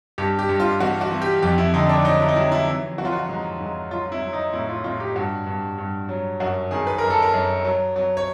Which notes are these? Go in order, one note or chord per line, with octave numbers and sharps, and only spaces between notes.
G2 G4
G4
G2
F4
E3 F#4
F#4
E3
G4
F2 G4
E4
D3 D#4
D4
F#3 D#4
E4
D#4
F#3 E4
E4
E3
E3 F#4
F4
F#4
G#2
G#2
F#3 F4
E4
F#3
D#4
A2 E4
F4
A2 F4
G4
G2 F#4
G2
G2
F#3
F#2 F#4
D#3 G#4
B4
F#2 A#4
A4
A#4
F#2
F#3
F#3
C#5